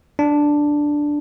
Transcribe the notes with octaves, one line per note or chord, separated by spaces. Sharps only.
D4